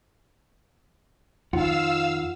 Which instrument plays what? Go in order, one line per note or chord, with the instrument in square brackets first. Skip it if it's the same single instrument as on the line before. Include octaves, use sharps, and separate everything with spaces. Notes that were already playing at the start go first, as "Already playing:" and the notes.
[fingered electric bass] F2 D#3 [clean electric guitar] F4 F#5 [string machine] F5 E6